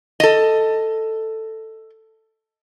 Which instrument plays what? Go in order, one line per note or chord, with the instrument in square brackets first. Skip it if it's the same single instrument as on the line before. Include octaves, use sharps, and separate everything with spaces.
[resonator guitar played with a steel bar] A4 D#5